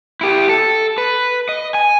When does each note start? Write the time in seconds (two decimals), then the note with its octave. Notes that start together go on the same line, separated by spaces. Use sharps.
0.21 E4 G4
0.49 A4
0.98 B4
1.49 D#5
1.74 G#5